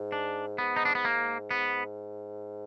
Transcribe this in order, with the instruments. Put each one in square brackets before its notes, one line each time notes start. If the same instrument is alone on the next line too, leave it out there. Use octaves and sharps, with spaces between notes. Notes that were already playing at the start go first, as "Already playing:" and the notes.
Already playing: [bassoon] G#2
[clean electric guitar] D4
[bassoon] G#2 [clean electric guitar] B3
[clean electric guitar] D#4
D4
B3
A#3
B3